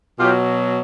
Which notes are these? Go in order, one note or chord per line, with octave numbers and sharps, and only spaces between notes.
B2 F#3 F4 G4